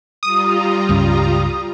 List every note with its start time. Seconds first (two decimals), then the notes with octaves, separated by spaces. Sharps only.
0.23 G3 F4 A#5 D#6
0.89 C#2 G2 C#3